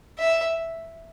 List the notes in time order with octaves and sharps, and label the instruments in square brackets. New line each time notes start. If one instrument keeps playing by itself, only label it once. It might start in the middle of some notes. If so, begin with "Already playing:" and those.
[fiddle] E5